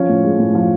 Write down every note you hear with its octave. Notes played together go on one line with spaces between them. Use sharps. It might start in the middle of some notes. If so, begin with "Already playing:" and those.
Already playing: F3 C#4 C#5
A2
G#3
A2
F3